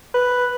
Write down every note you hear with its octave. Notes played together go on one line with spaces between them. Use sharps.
B4